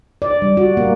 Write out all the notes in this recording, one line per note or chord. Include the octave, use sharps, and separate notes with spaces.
D5
G3
F#4
A#3